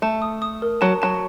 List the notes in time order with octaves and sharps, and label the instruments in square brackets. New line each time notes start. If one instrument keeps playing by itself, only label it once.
[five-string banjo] A3 [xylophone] A5
[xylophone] D#6
D#6
A#4
[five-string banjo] F#3 [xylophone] A5
[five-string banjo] F#3 [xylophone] A5